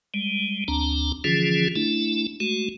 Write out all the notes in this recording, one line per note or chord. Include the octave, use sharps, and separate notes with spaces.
G3 G#3
D2 C4 D4 A#5
D3 E3 F3 C#4 F4 G#4
A3 D4 E4
G#3 A3 F#4